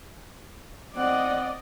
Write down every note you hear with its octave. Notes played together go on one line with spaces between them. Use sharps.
C4 D5 D#5 F#5